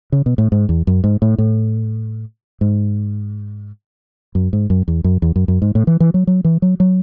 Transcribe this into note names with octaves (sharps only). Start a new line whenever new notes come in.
C#3
B2
A2
G#2
E2
F#2
G#2
A2
A2
G#2
F#2
G#2
F#2
E2
F#2
E2
F#2
F#2
G#2
A2
E3
E3
F#3
F#3
E3
F#3
F#3